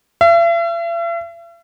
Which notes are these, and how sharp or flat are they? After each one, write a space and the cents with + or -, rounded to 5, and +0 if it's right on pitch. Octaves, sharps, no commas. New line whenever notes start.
E5 +45